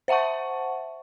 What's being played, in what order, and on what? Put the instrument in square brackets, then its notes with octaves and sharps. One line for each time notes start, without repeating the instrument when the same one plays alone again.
[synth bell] C5 E5 F#5 A5 C#6